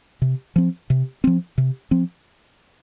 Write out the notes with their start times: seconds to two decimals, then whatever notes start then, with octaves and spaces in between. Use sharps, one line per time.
0.22 C3
0.56 F3 C4
0.90 C3
1.24 F3 C4
1.58 C3
1.91 F3 C4